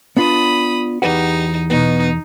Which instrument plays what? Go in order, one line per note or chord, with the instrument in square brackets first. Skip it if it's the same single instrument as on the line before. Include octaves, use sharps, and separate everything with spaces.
[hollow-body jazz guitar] B3 D4 F4 [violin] B5 D#6
[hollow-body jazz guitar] E2 B4 F#5 [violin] D#4 [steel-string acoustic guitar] G4
[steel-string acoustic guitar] B2 B3 [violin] D#4